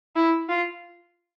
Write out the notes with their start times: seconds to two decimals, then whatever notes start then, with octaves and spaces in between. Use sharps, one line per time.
0.16 E4
0.49 F4